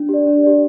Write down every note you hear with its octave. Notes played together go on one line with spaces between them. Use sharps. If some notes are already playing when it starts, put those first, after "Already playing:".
Already playing: D4
G4 D5
D4
G4 D5